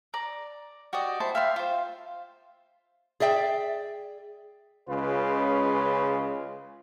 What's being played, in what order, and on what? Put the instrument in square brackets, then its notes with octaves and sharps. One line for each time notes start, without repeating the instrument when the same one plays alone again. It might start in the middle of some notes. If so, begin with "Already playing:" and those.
[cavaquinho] D5 A#5
F#4 G4 D5 D#5
E4 C5 A5
E5 F5 G5 C6
F4 C5
[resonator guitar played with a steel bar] G#4 D5 E5 G5
[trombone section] C#2 C#3 G#3 C#4 F4 B4